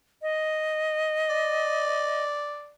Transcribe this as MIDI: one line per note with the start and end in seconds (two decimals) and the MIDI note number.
0.22 2.24 75
1.29 2.73 74